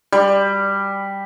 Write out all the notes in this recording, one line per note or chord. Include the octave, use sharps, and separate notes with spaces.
G3